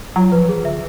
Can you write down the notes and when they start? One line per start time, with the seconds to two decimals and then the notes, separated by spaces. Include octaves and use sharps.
0.16 F#3 F4
0.32 F3 B4
0.48 E3 G#4
0.65 D3 E5